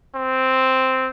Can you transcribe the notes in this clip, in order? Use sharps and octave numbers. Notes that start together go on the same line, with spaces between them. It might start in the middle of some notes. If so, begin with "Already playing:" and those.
C4